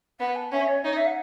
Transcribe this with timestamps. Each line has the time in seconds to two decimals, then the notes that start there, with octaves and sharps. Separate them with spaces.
0.20 B3 F#5
0.35 A5
0.52 C#4 E5
0.68 C#5
0.84 D#4 C#5
0.95 E5
1.06 F#5